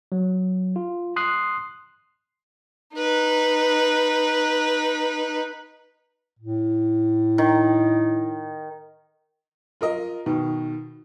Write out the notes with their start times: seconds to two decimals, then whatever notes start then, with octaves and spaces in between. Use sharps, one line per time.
0.12 F#3
0.76 F4
1.16 C6 D#6 F#6 C7
2.96 D#4 B4
6.39 A2
7.38 D#3
9.81 F4 A#4 D#5
10.26 B2 D#3